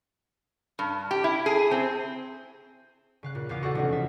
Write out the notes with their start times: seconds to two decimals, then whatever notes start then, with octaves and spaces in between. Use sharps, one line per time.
0.79 G2
1.11 G4
1.24 E4
1.46 G#4
1.71 C4
3.23 C#3 F5 F#6
3.35 A#2
3.49 E2 B3 F5 D6
3.63 F#4 A4 D5 F#5
3.75 F1 C#2 C#4
3.92 E5